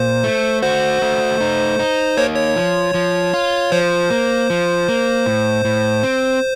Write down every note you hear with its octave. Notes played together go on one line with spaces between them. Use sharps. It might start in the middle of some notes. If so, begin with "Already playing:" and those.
Already playing: A#2 C5
A3
F#4 C5
A3
D#4
D#4
A#3 C#5
C#5
F3
F3
F4
F3 C5
A#3
F3
A#3
A2
A2
C4